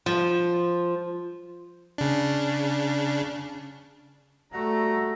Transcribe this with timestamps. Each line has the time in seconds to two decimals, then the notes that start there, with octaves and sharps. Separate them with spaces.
0.06 F3
1.98 C#3 D4
4.52 G3 A3 F#4 A#5